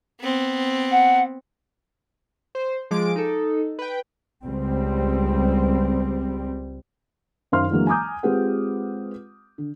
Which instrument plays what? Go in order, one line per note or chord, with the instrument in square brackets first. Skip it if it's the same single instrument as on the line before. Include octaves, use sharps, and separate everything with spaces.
[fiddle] B3 C4
[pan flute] F#5
[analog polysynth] C5
F3 G#3 D6 D7
D#4 A4
B4 G5
[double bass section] C#2 G3 C4
[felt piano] F#2 D#3 C5 F5 C6 F6
D3 E3 F#3 G#3 A#3
G#5 A#5 D6 D#6 G6
G#3 C4 F4 G4 B4 F#5
D3